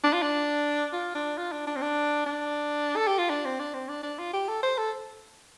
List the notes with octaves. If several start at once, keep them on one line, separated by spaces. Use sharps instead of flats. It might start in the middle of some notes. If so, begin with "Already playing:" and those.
D4
F4
D4
F4
D4
F4
D4
D4
C4
D4
D4
A4
G4
F4
D4
C4
D4
C4
D4
D4
F4
G4
A4
C5
A4